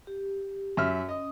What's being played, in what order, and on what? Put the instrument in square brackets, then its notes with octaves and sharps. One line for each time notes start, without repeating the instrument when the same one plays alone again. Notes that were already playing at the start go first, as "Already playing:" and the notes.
[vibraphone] G4
[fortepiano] F#2 E5 F6
[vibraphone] C#4 D#6 [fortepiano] D#5